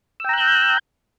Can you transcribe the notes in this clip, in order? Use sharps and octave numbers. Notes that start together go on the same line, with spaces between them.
G5 A#5 E6 F#6 G6